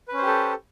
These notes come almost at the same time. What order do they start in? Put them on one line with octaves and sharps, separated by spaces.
B4 C#4 C5 G4 A4